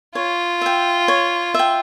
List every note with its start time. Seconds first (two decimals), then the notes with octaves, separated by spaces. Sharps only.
0.15 F4 C#5
0.61 E5 G5
1.08 C#5
1.54 E5 G5